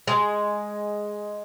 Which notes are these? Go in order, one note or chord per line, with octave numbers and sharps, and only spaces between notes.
G#3